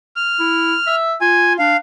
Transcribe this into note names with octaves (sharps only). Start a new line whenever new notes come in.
F6
E4
E5
F4 G#5
D4 F5